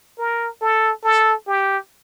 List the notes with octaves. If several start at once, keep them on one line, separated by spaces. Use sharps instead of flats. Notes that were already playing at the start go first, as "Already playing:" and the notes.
A#4
A4
A4
G4